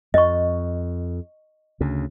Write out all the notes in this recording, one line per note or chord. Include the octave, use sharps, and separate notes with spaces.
F2 D#5 C#6
D2 C#3